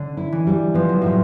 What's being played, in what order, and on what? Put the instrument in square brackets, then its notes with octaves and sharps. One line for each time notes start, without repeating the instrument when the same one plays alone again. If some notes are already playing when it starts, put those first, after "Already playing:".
Already playing: [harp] D3 [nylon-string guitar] C#4
[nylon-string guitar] E4
[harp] E3
[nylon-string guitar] G3
[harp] F3 [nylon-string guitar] B3
[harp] F#3
[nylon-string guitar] A2 [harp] F3